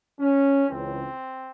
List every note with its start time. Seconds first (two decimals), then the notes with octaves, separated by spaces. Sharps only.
0.19 C#4
0.69 C#2 C#3 E3 C4